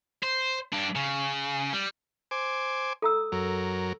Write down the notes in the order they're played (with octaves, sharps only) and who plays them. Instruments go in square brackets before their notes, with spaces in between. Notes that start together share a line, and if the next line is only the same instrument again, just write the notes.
[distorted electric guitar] C5
G2 D4
C#3
G3
[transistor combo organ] C5 G#5 D6
[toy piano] A4 A#5 E6
[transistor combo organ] F#2 F#3 A#4